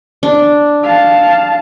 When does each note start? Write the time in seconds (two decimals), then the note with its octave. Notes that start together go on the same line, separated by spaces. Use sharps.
0.23 D4
0.83 F5 A5